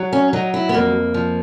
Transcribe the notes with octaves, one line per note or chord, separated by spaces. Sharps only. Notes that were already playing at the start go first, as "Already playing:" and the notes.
Already playing: F#3
C#4
F#3 D#4
E4
B3
F2 A#3
F3